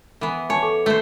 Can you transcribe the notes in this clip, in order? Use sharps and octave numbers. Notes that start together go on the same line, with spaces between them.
E3 B3
C#5 G#5 A5 C#6
A4 C#6 D6
A3 C5